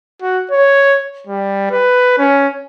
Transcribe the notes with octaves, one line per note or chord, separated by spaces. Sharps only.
F#4
C#5
G3
B4
C#4